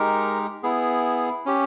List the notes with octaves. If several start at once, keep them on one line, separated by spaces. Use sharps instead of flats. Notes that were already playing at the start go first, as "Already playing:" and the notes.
Already playing: G#3 D#4 G4 A#4
B3 E4 G#4
C#4 G4